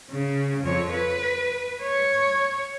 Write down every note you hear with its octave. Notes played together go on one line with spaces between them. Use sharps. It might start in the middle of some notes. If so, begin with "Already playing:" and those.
C#3
F2 C#5
B4
C#5